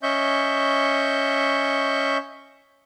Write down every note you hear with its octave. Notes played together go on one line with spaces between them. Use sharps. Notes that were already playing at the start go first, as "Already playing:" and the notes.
C#4 D#5 E5 C#6 G6